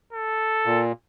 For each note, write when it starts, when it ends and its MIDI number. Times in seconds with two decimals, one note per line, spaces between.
0.13 0.84 69
0.65 0.92 46